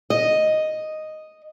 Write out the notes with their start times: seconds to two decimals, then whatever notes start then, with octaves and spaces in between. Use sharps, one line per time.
0.10 D#5